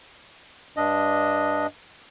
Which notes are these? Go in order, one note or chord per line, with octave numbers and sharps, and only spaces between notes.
G2 D4 D#5